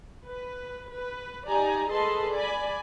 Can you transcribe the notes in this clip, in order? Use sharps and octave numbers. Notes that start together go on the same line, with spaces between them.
B4
B4
D#4 G4 D5 G#5 A#5
G#4 A4 B4 D#5 A5 C6
D5 G#5 B5